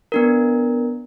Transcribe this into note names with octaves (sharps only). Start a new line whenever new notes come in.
B3 D4 A#4